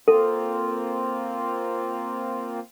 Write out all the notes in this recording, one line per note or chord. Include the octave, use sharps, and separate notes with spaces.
A#3 C4 F4 A4